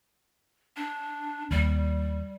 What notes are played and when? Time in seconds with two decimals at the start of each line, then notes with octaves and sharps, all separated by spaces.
0.76 D4
1.51 D#2 G3